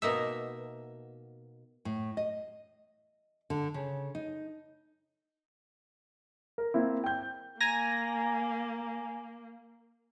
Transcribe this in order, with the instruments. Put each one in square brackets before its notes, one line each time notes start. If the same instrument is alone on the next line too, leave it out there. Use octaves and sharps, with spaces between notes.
[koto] B2 A#3 D#4 E5
[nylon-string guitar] A2
D#5
D3
C#3
D#4
[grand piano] A#4
A#3 C4 E4
G5 G6
[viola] A#3 [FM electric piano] G#5 A#5 A#6